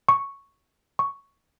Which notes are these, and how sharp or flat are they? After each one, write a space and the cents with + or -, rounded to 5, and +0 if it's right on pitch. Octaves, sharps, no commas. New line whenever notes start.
C#6 +0
C#6 +5